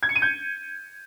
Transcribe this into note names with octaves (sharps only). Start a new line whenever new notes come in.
G#6
C#7
D#7
G6